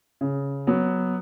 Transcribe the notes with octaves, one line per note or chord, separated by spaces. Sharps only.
C#3
F#3 B3